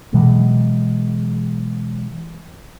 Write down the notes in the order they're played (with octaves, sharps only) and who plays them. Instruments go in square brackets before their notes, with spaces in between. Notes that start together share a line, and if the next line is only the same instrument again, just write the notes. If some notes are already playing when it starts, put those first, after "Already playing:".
[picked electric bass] B2 E3 F#3 G#3